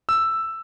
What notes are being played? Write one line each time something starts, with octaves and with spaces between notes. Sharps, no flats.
E6